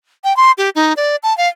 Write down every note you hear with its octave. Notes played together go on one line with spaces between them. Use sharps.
G5
C6
G4
D#4
D5
A5
F5